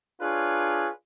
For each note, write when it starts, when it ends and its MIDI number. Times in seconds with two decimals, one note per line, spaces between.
0.21 0.89 62
0.21 0.89 65
0.21 0.89 68
0.21 0.89 71
0.21 0.89 73